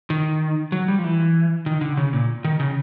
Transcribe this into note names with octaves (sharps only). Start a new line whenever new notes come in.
D#3
F#3
G3
F3
E3
D#3
D3
C#3
A#2
D#3
C#3